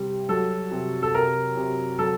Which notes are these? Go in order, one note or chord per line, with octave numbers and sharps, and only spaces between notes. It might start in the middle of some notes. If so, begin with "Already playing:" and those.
Already playing: C3 G3
F#3 A4
C3
A4
C3 A#4
C3
F#3 A4